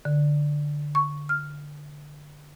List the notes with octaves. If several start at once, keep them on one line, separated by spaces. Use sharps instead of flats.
D3
C#6
F6